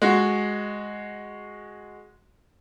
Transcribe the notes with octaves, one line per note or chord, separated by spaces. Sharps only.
G#3 F#4